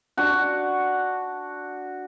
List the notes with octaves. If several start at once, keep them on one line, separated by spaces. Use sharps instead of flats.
D4 F#4